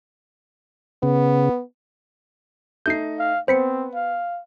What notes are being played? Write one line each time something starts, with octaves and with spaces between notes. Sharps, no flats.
C#3 B3
A3 D#4 G6 C7
F5
B3 C4 C5 B6 C#7
F5